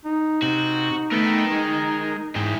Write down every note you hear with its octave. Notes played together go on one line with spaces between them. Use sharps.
D#4
C3 D#4 F#4
A3 B3 A#4 G5
G#3
G#2 E3 G4